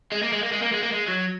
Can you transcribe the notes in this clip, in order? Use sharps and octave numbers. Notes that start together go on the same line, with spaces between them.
G#3
A#3
G#3
A#3
G#3
A#3
G#3
A#3
G#3
F#3